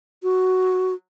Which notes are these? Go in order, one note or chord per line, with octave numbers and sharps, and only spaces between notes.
F#4